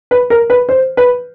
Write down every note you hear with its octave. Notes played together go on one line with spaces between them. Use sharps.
B4
A#4
B4
C5
B4